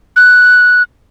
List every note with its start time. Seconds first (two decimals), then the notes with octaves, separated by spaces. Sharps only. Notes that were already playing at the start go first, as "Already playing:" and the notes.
0.16 F#6